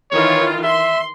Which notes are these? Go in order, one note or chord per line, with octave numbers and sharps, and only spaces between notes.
D#3 E3 F4 C#5
E5 C6